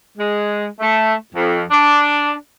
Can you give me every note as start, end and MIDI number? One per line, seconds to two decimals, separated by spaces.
0.17 0.64 56
0.80 1.13 57
1.33 1.63 41
1.71 2.32 62